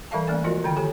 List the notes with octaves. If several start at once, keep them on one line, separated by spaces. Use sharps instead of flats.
E3 G3 A4 E5 F5 A5
A3 A#3 C#4 D5 G#5
F3 G#3 F4 F#4 A#4 D#5
D3 D#3 G5
G4 A4 C#5 G#5